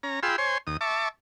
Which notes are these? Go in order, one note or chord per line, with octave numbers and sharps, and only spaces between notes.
C#4 A#5
F4 G#4 G5 B5 C6 E6
C5 C#5 G#5 C6
D#2 D#6
E5 A5 C#6 D6